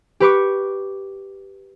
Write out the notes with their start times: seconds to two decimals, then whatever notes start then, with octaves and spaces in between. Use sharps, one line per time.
0.20 G4 B4 C#6 D6